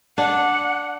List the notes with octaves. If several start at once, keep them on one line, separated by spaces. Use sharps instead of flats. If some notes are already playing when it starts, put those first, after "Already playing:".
D4 F#5